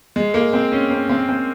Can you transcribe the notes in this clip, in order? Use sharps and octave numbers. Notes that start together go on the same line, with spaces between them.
G#3
A#3
C4
C#4
C4
C4
C4